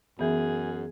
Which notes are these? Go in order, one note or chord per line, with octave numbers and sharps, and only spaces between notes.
F#2 E3 B3 G#4